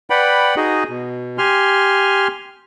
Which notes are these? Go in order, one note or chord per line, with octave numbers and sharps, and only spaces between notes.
B4 D5 F#5 G5 B5
D#4 F#4 G#4 D#5
B2
G4 G#5 C6 F6